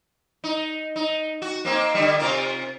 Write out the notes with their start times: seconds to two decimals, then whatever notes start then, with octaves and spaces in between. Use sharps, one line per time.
0.44 D#4
0.96 D#4
1.42 F#4
1.65 A#3 C4 D#4
1.95 D3 G3
2.19 C3 F4 A#4